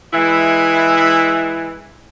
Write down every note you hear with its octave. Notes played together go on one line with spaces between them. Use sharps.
E3 G#3 E4